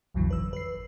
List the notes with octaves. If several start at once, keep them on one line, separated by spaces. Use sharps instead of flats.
B1 F2 A#2 D3 E3 F#3
G#1 B4 E6
B4 C7